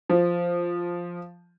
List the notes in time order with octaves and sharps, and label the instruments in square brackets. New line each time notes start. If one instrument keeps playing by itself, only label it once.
[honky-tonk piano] F3